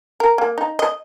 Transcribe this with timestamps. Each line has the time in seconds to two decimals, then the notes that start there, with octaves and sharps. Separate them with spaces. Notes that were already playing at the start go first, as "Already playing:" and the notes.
0.20 A#4
0.38 A#3
0.58 D#4
0.79 D#5